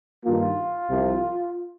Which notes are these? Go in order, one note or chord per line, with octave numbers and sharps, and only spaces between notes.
G2 D#3 A#3 F4
C2 C3 F3